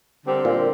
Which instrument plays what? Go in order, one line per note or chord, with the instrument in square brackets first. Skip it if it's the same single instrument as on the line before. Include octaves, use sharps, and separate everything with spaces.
[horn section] D3 G3 C4 G4 A#4
[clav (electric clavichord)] A#2